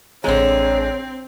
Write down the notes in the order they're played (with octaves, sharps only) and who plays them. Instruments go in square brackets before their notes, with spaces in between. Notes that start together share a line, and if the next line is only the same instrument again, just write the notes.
[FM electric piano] A1 A#5 [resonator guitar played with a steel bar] D3 G#3 [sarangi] C4 [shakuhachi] C#5